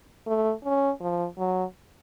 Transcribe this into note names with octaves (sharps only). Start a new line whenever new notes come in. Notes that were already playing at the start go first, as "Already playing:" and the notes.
A3
C#4
F3
F#3